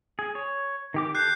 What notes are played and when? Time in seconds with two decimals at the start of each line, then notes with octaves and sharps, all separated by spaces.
0.19 G#4
0.35 C#5
0.94 D#3 G4 D6
1.15 G4 A4 F#6 G6 C7